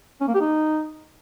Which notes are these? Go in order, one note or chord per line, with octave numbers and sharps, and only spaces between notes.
C#4
A#3
G4
D#4